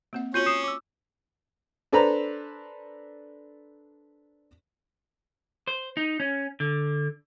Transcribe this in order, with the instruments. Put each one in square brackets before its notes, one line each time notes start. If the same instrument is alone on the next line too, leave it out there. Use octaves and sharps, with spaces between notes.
[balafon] A#3 C4 F#5
[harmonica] C#4 [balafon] F4 F#4 C#5 [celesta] G6 D#7 F#7
[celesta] D#6 C7 E7
D6 E6
[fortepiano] D4 A4 B4 C5 A#5 B5
[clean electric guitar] C5
D#4
C#4
D3